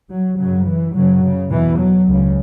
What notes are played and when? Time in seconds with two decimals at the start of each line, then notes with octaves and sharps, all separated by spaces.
0.10 F#3
0.38 F#2 C#3 F#3
0.67 E3
0.94 F#2 C#3 F#3
1.23 C#3
1.51 E2 B2 E3
1.79 F#3
2.07 C#2 C#3